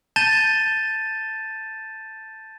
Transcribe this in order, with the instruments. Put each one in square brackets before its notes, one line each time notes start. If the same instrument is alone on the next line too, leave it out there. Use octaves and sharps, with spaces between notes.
[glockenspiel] A5 G6 A6 D#7 E7 G7